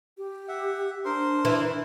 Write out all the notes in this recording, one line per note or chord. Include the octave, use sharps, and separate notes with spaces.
G4
E5 F#5
D4 A#4 C5 C6
E3